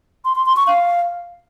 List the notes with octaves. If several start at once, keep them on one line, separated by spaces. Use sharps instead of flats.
C6
C6
C6
C#6
F5